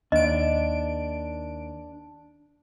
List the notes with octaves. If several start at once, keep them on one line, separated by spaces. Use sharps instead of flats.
D#2 D4 D#5 D7